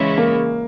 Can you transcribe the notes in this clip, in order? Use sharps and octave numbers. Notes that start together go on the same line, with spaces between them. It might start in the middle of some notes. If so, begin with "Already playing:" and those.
Already playing: C#3 E3 G#3 C#4 E4
A#3